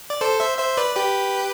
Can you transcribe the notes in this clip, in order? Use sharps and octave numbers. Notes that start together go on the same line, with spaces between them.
D5
A4 C5
C5 E5
C5 E5
B4 D5
G4 B4